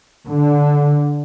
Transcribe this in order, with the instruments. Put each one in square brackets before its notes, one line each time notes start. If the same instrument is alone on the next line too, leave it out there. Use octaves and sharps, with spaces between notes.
[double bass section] D3